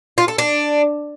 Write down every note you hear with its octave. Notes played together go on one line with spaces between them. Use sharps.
F4
A4
D4